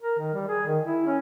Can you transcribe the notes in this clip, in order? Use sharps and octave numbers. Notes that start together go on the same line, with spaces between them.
A#4
D#3
G3
G#4
D#3
E4
C#4